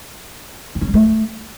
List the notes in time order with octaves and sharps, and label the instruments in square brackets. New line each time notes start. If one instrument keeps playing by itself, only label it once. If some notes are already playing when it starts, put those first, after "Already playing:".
[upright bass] C4
C#4
G3
A3